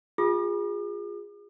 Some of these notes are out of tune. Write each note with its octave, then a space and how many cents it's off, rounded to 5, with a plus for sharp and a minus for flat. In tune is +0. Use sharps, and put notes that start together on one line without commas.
F4 +15 G#4 -20 D6 +45